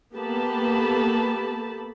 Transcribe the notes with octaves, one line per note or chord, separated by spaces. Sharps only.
A#3 B3 G4 A4 A5 B5